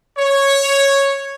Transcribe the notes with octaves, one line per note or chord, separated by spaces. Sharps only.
C#5